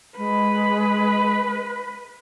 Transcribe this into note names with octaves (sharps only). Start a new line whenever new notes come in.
G#3 B4